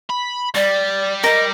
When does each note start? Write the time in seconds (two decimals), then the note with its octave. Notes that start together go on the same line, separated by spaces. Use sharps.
0.10 B5
0.55 G3 D5
1.24 A#4 D#5